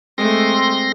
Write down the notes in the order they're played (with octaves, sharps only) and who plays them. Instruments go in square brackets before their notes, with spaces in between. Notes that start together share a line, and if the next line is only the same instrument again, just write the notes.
[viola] G#3 A3 [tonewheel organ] C4 C6 A#6